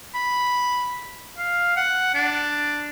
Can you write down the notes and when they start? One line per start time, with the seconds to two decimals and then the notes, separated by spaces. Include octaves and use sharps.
0.14 B5
1.38 F5
1.76 F#5
2.14 D4